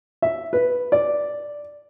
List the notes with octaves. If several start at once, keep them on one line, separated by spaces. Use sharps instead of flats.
E5
B4
D5